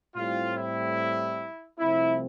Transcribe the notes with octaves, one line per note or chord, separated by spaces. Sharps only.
A2 G3 C4 F4
E4
C2 C3 F3 A3 C4 E4